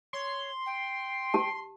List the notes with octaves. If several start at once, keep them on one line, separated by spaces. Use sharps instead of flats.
C#5 C6
G5
G4 A5